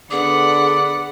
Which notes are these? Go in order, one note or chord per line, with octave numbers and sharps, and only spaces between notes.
D3 B3 G#4 D5 F#5